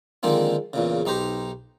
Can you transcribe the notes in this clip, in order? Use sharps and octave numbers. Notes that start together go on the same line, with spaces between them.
D3 D#3 F3 G#3 A#3 C4
E2 A#2 C#3
B1 D#4 G4 C5 A#5